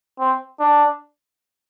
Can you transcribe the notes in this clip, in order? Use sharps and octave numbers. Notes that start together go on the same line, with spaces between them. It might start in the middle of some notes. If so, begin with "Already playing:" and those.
C4
D4